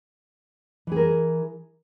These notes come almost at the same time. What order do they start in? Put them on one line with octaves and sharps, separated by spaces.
E3 G#4 A#4